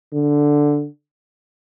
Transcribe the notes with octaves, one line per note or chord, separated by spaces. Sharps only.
D3